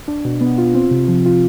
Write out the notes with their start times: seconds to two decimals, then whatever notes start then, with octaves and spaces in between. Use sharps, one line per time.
0.08 D4
0.25 B2
0.41 B3
0.58 F4
0.74 C4
0.91 C3
1.08 F3
1.26 F4